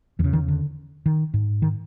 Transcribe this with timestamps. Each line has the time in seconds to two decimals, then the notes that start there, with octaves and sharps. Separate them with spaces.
0.19 E2 E3
0.24 C#3
0.33 D#3
0.48 D3
1.06 D#3
1.34 G#2
1.62 D#3